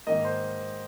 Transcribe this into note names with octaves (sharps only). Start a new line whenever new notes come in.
G#2 D#3 A#3 D#5
C5